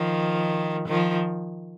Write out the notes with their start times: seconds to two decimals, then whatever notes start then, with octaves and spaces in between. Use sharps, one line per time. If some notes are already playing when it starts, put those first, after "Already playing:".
Already playing: D#3 F3
0.88 D#3 F3